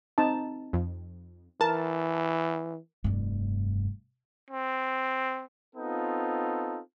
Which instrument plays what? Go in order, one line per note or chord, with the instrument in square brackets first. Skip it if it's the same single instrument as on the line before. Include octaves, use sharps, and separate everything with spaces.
[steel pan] C4 D#4 A5
[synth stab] F2
[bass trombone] E3 [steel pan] A#4 [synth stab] A5
[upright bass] F1 G2
[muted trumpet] C4
[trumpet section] B3 C4 D#4 F4 A4